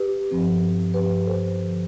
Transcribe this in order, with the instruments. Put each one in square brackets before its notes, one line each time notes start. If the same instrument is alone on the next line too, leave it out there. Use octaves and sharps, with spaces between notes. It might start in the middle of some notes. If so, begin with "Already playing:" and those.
Already playing: [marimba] G4 B4
G2 F3 C4
G2 F3 C4 G4 B4
A4 C5
G2 D3 F3